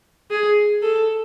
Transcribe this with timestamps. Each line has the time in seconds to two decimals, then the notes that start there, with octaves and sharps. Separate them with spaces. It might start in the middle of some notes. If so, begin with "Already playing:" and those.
0.31 G#4
0.82 A4